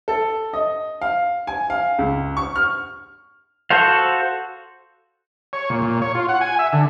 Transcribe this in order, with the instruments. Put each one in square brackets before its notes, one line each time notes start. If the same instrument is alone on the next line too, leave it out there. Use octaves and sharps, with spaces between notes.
[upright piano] A4
D#5
F5
G#5
F5
C#2
C#6
F6
[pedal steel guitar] F#4 A4 C5 F5
[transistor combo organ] C#5
A#2
A#2
C#5
F4
F#5
G#5
E5
D3